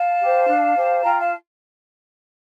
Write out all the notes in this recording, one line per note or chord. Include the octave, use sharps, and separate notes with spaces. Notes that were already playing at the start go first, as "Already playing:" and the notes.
Already playing: F5 A5
G4 C5
D4
G4 C5
F4 G5 A#5
F5 A5